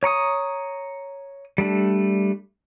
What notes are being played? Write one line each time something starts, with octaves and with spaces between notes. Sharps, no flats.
C#5 A#5 C#6 D#6
G3 A3 D4